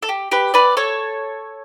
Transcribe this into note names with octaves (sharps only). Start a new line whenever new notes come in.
A4
G4
G4 B4
B4 D5
A4 C#5